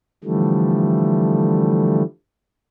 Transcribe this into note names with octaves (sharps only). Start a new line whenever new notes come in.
D3 E3 F3 G3 A3